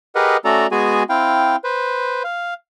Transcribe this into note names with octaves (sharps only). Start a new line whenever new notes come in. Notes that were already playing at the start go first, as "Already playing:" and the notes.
G4 G#4 A#4 B4 D#5 F#5
A3 C#4 F#4 A4 D5 A#5
G#3 B3 F#4 G#4 G#5
C4 E4 F5 G5
B4 C5
F5